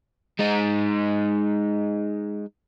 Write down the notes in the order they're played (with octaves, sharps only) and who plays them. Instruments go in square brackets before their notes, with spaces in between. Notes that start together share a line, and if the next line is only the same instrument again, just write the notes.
[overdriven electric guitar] G#3 D#4